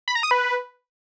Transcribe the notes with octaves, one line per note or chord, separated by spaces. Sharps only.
B5
A#5
D#6
B4